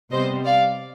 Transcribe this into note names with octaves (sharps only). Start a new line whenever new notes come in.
C3 G3 B3 C5 D#5
D5 F5